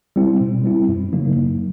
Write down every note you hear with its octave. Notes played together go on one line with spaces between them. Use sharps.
G3 C4 E4
B2
G3 C4 E4
F#2
C#3 F#3 A#3 D#4
F#2